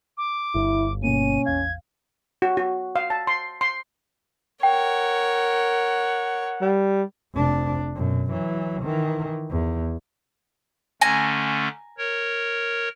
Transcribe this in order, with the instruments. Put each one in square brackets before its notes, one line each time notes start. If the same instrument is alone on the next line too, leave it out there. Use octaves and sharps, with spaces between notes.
[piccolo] D6
[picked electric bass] G1 [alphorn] E4
[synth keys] B2 A#3 [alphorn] C#4 [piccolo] D#7
[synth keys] A1 E2 F5 [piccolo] G#6
[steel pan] F#4
F#4
F5
A5
C6
C6
[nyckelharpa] A#4 C#5 [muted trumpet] F#5 [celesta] G5
[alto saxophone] G3
[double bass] F1 D4
F#2 B2
E3 F#3
D#3 E3
E2
[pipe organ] D3 A3 C#4 [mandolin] G#5 A#5
[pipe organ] A#4 C#5